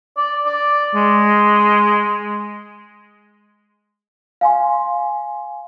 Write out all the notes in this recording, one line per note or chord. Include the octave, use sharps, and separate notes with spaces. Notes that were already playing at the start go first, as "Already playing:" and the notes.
D5
D5
G#3
F5 G#5 C6